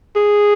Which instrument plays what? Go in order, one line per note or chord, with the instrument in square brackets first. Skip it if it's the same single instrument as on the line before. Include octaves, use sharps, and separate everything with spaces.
[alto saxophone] G#4